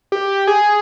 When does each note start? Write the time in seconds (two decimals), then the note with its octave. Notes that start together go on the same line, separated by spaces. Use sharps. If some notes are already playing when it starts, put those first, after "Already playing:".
0.12 G4
0.47 G#4